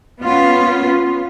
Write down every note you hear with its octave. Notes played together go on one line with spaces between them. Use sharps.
B3 C#4 F4